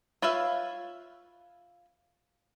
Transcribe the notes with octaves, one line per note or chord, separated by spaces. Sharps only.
F4 B4 C#5 E5 F5